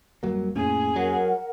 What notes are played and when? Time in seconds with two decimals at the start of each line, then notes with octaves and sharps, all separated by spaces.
0.23 D1 F#2 F#3 G3 A#3
0.56 F2 A2 A#3 C#4 G#4
0.96 F#3 A#4 F#5